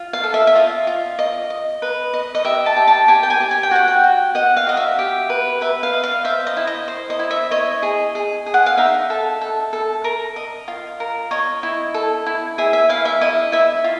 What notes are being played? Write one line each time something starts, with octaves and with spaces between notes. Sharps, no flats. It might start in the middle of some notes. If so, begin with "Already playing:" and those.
Already playing: F4
F5
A4
E5
E5
F4 D#5
F4
D#5
D#5
B4
D#5
D#5
G4 E5
A5
G4
A5
G4 G#5
G5
G#5
G4
G#5
G5
F#4 F#5
G5
F#4
D#5 F#5
F5
F#4 D#5
E5
G4
B4
B4 E5
F5
D#5
F5
C5 E5
D#5
E4
D#5
C5
D#5
E4
E5
C#5 D#5
G#4
G#4
G#4
F#5
F5
D#4 E5
A4
A4
A4
A#4
D#5
F4
A#4
C#5 D#5
E4
A4
E4
G#4 E5
E5
E4 F5
E5
E4 D#5
E4 E5
F4